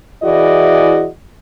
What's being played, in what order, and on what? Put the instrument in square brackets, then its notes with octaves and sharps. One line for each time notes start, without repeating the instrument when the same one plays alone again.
[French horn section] E3 E4 F#4 G#4 D5 D#5